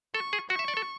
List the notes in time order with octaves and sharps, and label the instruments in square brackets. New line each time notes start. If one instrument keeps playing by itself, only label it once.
[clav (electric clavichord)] A4 [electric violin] C#6
[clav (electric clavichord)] G#4
[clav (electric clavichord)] F#4 [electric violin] C#6
[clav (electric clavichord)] E5
D5
A4